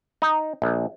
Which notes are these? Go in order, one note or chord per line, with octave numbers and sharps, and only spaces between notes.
D#4
A#1